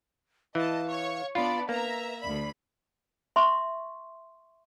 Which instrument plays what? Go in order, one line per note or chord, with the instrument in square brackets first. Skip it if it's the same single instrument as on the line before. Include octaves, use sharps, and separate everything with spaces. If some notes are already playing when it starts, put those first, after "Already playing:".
[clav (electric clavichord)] E3 [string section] D#5 A5 [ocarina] F5
[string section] C#5 C#6
[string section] B3 D4 D5 [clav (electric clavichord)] F4 [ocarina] B5
[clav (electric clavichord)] A#3 [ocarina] B4 [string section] E5 A#5
[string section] D2 B5 [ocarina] D5
[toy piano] E5 C6 C#6